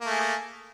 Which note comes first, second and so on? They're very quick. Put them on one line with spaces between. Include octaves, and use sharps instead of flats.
A#3 A3 G#4